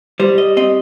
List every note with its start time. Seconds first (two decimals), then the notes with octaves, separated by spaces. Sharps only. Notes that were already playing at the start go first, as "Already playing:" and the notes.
0.20 G3 C5
0.38 D#5
0.57 C4 D#5